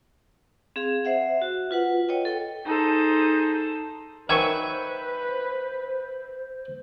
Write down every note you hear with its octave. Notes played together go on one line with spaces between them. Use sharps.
C4 G#4 F5
C5 E5 F#5
F#4
F4 B4 F#5
C#5 D#5 G5
A4 G5
D#4 G#4 A4 C5
D#3 F#3 B4 C5 E5 G#5 C#6